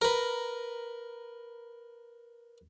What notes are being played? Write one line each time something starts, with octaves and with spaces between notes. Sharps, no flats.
A#4 B4